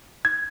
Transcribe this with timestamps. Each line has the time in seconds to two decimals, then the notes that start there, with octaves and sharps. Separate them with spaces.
0.25 G#6